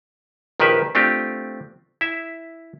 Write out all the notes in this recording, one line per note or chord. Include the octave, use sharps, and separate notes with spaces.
A#1 D#3 F3 G4 B4 E5
A3 C4 D4 F4 G4
E4 E5